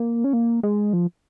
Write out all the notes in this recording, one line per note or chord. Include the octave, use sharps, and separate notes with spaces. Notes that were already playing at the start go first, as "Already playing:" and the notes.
Already playing: A#3
C#4
A#3
G#3
F3